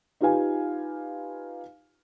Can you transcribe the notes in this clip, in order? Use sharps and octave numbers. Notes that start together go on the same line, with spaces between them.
D#4 F4 G4 B4 F5 G#5